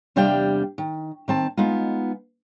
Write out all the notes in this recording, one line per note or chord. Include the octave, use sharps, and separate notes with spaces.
E2 C3 G3 D4 F5 G5
D#3
D#3 C4 A5
G#3 B3 D#4 F4